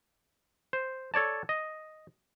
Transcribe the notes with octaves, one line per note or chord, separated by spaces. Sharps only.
C5
A4 C#5 D5 A5
D#5